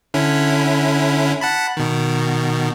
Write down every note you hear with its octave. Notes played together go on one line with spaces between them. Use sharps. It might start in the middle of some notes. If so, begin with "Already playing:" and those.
D3 C#4 E4
F#5 A5 B5
B2 D#3